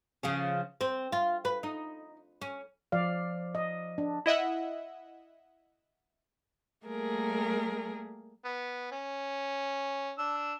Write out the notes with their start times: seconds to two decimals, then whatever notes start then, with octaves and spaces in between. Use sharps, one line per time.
0.23 C#3 F3 C#4
0.81 C4
1.12 F4
1.45 B4
1.63 D#4
2.41 C#4
2.92 F3 D5 F5
3.55 D#5
3.98 D4
4.26 E4 D#5 E5 F#5
6.85 G3 A3 A#3 G#4 A#4
8.45 B3
8.92 C#4
10.18 D4 E6